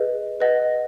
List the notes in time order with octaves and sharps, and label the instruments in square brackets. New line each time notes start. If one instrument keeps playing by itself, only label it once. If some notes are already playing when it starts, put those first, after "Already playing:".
Already playing: [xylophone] G#4 B4 D#5
B4 D#5 F#5